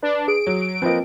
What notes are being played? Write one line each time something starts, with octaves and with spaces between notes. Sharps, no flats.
D4 B4
G#4 D7
F#3 C#5
F3 A#3 C4 B4 C5 D#5